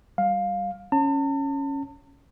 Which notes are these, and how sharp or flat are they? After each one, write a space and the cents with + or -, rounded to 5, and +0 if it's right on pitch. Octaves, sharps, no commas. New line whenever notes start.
G3 +0 F5 +10
C#4 +0 A5 +40